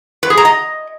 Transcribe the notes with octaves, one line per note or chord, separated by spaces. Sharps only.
B4
G#4
A#5
D#5